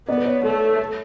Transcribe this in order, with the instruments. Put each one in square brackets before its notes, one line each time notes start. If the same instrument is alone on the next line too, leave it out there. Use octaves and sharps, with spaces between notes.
[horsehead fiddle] B3 [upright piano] D5
[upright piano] B4
C#5
[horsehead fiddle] A3 [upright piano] A4
[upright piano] A4